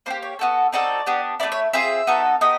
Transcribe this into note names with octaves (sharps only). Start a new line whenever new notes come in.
A#3 D4 G4 C5
C#5
B3 D#4 F#4 A4
C4 D#4 F#4 A4 D5
B3 D4 G4
A3 C4 E4 D5
C#5
C4 F4 G#4 E5
B3 D#4 F#4 A4
B3 D#4 G4 D#5